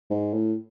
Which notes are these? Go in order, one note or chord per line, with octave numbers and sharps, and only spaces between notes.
G#2
A2